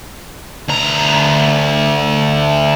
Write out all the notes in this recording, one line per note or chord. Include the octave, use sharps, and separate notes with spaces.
D2 A#5